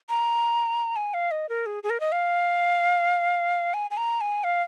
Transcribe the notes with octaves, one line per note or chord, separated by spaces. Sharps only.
A#5
G#5
F5
D#5
A#4
G#4
G#4
A#4
D#5
F5
G#5
G#5
A#5
G#5
F5